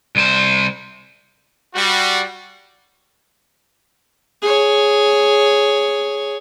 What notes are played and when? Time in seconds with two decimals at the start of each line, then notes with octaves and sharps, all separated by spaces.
0.16 C2 C5
1.75 G3 F#4
4.42 G#4 C#5